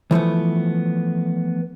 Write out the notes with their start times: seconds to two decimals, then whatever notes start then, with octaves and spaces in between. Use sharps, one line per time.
0.11 E3 F3 A3 B3